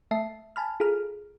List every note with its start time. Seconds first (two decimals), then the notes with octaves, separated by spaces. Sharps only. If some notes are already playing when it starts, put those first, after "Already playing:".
0.11 A3 E5 A5 C7
0.56 G#5 A5 B5 F6
0.80 F4 G#4 A4 A#5 F6